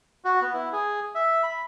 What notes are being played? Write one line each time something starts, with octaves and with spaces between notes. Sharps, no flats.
F#4
B3
E4
G#4
E5
B5